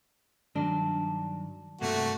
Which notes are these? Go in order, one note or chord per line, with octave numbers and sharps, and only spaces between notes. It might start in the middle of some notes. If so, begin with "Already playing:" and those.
G2 D#3 F#3 D4
G2 C3 A3 A#3 F#4